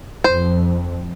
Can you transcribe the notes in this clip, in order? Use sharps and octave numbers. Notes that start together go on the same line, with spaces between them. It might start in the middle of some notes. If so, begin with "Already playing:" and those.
F2 C5